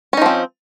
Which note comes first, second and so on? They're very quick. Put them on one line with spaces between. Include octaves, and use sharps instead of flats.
C#4 D#4 F3 C4